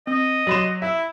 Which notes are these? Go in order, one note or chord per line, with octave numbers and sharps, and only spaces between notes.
C4 D#5
F#3 D5 B5 C6 E7
E4 E5